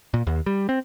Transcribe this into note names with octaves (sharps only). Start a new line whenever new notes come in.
A#2
D#2
G3
C4